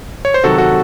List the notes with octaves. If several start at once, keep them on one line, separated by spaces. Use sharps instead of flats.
C#5
C5
C3 D#3 F#3 F#4 A4
F#4 A4